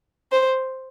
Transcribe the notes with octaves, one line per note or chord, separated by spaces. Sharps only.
C5